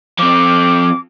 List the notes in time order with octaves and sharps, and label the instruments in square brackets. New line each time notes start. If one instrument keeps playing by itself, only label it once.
[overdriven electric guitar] F3 C4 [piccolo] D6